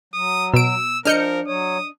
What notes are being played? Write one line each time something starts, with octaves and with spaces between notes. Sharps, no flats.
F#3 D#6
B2 E6 D7
F3 D4 A#4 D#5 F6 G6 C#7
F#3 C#5 D#6